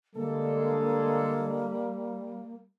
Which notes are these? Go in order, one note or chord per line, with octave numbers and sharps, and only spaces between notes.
D3 G3 G#3 A#3 A4